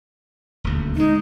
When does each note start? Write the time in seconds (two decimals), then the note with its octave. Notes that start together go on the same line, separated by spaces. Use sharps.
0.64 D#1 D2
0.96 G#3 A3 D#4